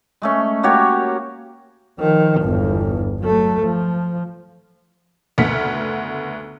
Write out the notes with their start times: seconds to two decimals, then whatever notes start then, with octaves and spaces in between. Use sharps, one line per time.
0.22 G#3 A3 C#4
0.63 A#3 F#4 G4 C#5
1.99 D#3 F3
2.41 G1 E2
3.20 F#3 A3
3.63 F3
5.38 F#1 D2 B3 F6 B6 C#7